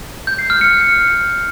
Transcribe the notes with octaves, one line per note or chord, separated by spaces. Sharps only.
G6
C7
F6
C#7